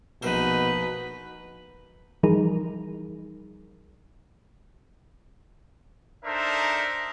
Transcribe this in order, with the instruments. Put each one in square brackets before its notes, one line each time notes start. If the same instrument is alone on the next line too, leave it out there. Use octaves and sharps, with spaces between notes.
[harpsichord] A#1 C5 [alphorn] B2 [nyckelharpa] D#4 B4
[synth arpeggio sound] E3 F3 G3 D#4 G#4 A#4
[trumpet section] D4 D#4 A4 A#4 C5 E5